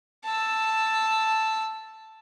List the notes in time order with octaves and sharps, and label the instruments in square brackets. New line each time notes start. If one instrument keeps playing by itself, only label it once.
[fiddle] A5 E6